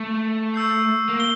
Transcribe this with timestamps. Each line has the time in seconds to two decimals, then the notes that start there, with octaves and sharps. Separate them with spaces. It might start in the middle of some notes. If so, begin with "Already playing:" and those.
Already playing: A3
0.54 C#6 E6 G6 C7
1.09 A#3
1.20 G7